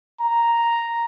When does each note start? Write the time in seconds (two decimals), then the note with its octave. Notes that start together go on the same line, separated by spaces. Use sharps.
0.21 A#5